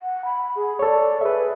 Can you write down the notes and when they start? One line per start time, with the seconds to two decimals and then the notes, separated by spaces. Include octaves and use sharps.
0.01 F#5
0.25 B5
0.55 G#4
0.79 A4 C#5 D5
1.21 G#4 B4 E5